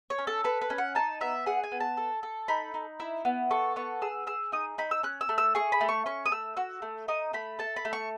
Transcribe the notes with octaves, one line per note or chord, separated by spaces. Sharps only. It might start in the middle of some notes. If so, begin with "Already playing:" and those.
C#5
C#4
A4
A4 B4
B4
C#4
F#5
D#4 A5
B3 E5
G#4 F#5
G#5
B3
A5
A4
A4
D#4 B5
D#4
E4
B3
A4 C#6
B3 C#6
G#4 E6
G#4 E6
D#4 D#6
D#4 B5
E6
C#4 F#6
E6
A3
E6
G#4 C#6
B5
A3
C#6
C#4 C#6
D#6
A3 E6
F#4 E6
A3
D#4 D#6
A3 B5
A4 A5
B5
A3
C#6